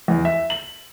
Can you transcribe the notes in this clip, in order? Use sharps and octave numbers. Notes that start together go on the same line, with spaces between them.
E2
E5
F#7